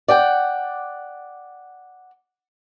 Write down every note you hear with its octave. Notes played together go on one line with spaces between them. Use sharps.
D5 F#5 G5